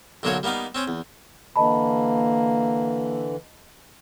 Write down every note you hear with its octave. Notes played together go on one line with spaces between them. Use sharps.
B1 D3 F#3 A#3 C5 C#5
G3 A#3 B3 D#4 F5
C4 C#4 C5
E2
D3 E3 A#3 D#5 A5 B5